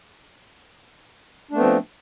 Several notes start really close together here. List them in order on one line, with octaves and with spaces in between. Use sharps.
D4 A3 B3 C4 F3